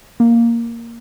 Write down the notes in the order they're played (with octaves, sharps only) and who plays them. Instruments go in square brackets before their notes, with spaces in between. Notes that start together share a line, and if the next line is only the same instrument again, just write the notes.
[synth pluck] A#3